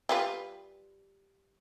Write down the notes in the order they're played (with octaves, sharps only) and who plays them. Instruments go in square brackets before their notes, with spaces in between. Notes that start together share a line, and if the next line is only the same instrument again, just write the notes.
[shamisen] G3 F4 B4